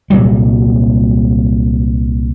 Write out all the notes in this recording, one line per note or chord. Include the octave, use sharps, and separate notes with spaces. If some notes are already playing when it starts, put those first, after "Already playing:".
C2 A#2 F#3 G3